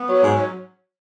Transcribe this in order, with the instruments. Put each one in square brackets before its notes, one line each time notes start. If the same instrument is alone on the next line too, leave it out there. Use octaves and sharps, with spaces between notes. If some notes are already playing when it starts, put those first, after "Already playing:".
Already playing: [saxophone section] B3
F#3
[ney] C#5
[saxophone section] G#2
[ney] C#5